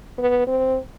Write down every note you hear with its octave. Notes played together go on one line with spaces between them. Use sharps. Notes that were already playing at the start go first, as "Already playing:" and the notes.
B3
C4